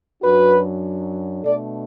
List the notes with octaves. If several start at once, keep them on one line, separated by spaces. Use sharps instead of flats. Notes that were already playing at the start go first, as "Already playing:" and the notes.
F#2 F#3 D4 F#4 B4
B2 A3 D4 A4 D5